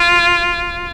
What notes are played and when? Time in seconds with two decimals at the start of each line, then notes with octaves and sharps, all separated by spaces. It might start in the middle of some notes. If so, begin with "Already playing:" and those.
Already playing: F4